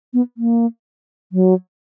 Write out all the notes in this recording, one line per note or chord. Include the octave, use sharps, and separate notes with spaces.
B3
A#3
F#3